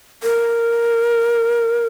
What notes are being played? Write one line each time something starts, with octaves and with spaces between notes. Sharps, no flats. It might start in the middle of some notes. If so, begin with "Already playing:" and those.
A#4